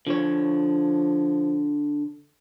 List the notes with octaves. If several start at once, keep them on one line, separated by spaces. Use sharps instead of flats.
D3 F3 C#5